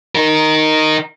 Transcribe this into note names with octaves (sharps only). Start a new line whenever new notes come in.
D#4 A#4